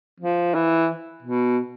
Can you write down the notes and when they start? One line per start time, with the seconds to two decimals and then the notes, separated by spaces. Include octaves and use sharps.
0.20 F3
0.54 E3
1.23 B2